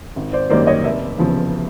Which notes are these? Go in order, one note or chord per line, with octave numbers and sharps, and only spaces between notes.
G#1
C5 D5
F#2 D#3 G3 A#3 C5 D5
C#5 D#5
F1 D5 E5
E2 C#3 F3